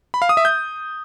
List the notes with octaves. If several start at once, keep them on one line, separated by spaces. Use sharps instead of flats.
B5
F5
D#6
E5
G6